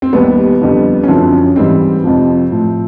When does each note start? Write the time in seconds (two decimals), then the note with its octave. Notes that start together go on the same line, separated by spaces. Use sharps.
0.02 C4
0.13 D#2 D#3 G3 B3
0.61 F2 D3 G3
1.03 C#4
1.08 F#2 D3 F3 C4
1.33 C#4
1.56 G#2 E3 G3 C4
2.04 F2 C3 F3
2.52 A2 F3